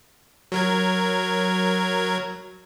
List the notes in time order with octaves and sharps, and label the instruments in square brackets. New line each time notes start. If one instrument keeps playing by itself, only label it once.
[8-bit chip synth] F#3 A#4 G#6